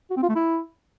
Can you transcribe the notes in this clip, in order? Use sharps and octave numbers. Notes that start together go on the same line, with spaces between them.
F#4
C4
F4
A3
E4